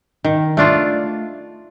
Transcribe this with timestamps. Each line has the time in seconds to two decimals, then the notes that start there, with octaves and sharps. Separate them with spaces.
0.24 D#3
0.57 A3 D4 F4